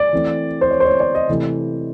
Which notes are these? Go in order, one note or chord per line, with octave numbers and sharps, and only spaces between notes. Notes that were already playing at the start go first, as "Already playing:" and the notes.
Already playing: D5
E3 A3 C4
C5
C#5
C5
C#5
D5
D#5
C3 E3 A3